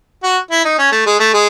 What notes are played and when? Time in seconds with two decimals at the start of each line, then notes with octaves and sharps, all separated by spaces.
0.23 F#4
0.51 E4
0.65 D#4
0.78 C#4
0.92 A3
1.06 G#3
1.20 A3
1.34 G#3